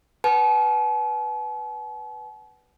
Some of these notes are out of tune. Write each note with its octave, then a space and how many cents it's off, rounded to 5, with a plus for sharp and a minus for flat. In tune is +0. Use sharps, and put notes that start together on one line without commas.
B4 +0 F#5 +45 A5 -45